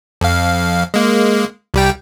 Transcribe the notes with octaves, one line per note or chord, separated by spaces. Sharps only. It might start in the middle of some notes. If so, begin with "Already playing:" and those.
F2 F5
G#3 A#3
C2 G3 G5